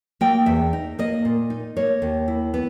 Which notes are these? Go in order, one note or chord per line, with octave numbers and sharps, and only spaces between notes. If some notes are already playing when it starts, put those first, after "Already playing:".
A#3 G5
E2 E5
D#4
A#3 D#5
A#2
D#4
A#3 C#5
D#2
E4
B3